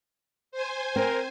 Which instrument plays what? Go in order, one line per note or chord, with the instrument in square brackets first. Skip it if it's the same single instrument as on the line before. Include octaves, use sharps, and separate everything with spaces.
[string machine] C5 G#5
[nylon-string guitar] C4 [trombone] A#4